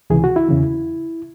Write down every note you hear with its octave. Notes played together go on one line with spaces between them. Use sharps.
C#2 C3 E3 G#4
F#4
E4
E2 C#3 E3